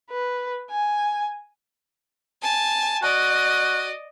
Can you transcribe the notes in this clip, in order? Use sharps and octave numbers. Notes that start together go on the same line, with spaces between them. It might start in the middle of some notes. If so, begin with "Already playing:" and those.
B4
G#5
G#5 A5
F#4 D5 D#5